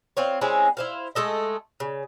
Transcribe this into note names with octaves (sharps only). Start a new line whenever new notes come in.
C4 F4 C#5
G#3 C4 C#4 E4
E4 C5 F5
G#3 A3 A4 D#5
C#3